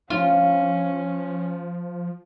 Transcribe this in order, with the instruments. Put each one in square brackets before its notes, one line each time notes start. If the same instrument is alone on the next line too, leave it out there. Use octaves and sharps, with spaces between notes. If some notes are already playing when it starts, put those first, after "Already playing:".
[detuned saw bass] F3 [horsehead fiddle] C#4 [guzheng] F4